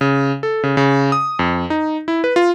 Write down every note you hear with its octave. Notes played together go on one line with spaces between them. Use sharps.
C#3
A4
C#3
C#3
D#6
F2
D#4
E4
B4
F4